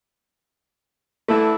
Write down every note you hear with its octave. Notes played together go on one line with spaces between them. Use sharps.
D3 E3 A3 E4